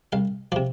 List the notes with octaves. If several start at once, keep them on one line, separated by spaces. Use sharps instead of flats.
C2 F5
C3 F3 D5